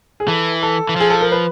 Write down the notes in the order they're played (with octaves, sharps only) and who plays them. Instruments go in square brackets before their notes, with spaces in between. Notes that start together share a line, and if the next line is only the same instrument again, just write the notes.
[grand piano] G#4
[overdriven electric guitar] E3 [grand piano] A4
[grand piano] A4
[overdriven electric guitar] E3
[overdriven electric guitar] F3 [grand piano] G#4
[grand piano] A4
A#4
B4